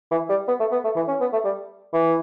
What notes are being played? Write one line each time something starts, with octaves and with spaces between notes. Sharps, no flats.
E3
G3
B3
A3
B3
A3
E3
C#4
B3
A3
G3
E3